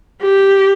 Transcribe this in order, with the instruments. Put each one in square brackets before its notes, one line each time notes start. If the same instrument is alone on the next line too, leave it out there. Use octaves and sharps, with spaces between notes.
[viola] G4